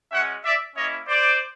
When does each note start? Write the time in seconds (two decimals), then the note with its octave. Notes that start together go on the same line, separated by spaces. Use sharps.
0.11 G#3 C#4 F#4 E5 F#5
0.43 D5 E5
0.76 A#3 C#4 E4 C#5 D#5
1.08 C5 D5